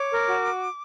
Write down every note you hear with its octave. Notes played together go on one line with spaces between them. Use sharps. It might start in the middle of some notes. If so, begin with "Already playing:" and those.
Already playing: C#5 D6
A#4
F#4